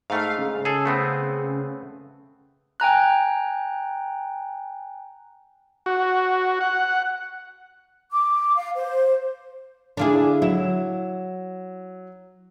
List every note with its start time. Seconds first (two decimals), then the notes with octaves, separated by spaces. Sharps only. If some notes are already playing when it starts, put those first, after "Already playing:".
0.10 G#2 A3 F5
0.39 C#3
0.65 G#4 A4
0.86 A3 B3 C4
2.80 G5 G#5 A#5 F#6
5.86 F#4
6.61 F#5
8.12 D6
8.56 F5
8.76 C5
9.97 D3 D4 E4 F4 G#4
10.42 F#3 E4 E7